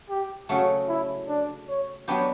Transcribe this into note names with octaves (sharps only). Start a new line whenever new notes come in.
G4
C#3 F#3 A3 F#4
E4
D4
C#5
F#3 B3 D4 G4